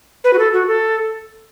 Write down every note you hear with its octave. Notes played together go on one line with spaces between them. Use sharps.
B4
F#4
A4
F#4
A4